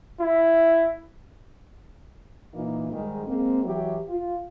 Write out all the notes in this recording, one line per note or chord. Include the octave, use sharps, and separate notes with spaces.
E4
A#2 E3 A#3 D#4
G#2 D#3 G3 G#3
G#3 A#3 C4
E3 F#3 E4 G4
F4